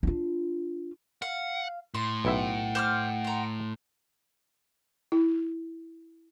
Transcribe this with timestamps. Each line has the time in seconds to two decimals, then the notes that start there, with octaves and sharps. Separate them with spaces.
0.03 D4 F4
1.22 F5 F#5
1.94 A2 C6
2.25 B1 E4 E5 F#5 G5
2.75 C5 D6 F6
3.24 A#5 C6
5.12 E4